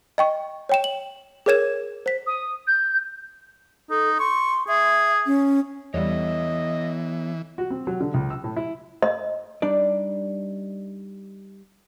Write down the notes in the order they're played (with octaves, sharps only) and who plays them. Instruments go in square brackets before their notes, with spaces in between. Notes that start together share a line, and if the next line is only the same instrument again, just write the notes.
[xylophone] D#5 G5 C#6
C#5 G5 E7
F#7
G#4 A#4 C#5 G#6 E7
C5 B6
[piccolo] D#6
G6
[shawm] D#4 [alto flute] A4
[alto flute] C6 [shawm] C#6
[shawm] G#4 [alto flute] E5
[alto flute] C#4
[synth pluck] E2 G3 [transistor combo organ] E3 [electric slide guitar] B3 A4 C#5 [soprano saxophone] D#5
[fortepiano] F#4
C4
F#3
D3
C#2
E6
A2
E4
[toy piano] D#5
[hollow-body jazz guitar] G3 D4 D#4 D5